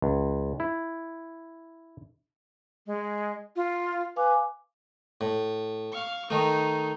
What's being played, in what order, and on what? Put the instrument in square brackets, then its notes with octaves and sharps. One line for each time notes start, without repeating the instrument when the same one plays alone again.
[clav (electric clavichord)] C#2
E4
[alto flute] G#3
F4
[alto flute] B4 [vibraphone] F5 G#5 D6
[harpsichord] A2
[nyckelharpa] F5 C#6
[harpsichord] D#3 A3 [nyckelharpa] D#4